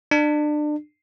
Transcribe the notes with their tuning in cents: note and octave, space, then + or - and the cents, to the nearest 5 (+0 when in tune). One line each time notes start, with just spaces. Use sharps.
D4 +30